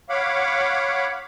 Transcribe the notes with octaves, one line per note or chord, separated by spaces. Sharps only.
C#5 F5 F#5 B5 D6